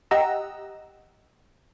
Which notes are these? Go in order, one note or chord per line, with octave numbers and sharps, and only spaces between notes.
G4 D#5 F#5 A#5 E6